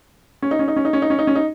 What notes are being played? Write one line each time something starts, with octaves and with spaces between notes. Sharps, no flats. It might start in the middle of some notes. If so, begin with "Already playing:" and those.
C#4
D#4
C#4
D#4
C#4
D#4
C#4
D#4
C#4
D#4
C#4
D#4